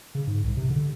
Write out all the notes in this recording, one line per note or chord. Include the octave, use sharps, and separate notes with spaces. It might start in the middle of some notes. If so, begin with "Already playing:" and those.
C#3
G#2
C2
C3
D3